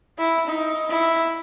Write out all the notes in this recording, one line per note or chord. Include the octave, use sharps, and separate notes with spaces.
E4
D#4
E4